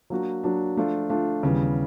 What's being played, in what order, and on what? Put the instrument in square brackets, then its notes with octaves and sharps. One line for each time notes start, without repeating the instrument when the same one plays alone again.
[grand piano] F#3 A#3 D4 F#4
F#3 A#3 D4 F#4
F3 A3 D4 F4
F3 A3 D4 F4
D#2 C#3 E3 G3 B3